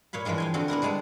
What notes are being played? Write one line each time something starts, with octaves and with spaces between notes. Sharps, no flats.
A#2 C#5 F5 B5
E3 F3 G3 G#3 F4
F5 G5 G#5
D3 C4 F#4 G#4 F5
B3 D4 E4 A#4
G3 G#3 B3 G#4 D5 A5